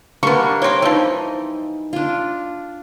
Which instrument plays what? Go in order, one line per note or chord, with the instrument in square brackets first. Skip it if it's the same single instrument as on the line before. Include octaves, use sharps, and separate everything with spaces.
[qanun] G3 A#3 D4 [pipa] B3 C#6
[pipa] C4 C#5 [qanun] G5 D6
[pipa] E3 F3 [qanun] D#4
[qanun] D4 F4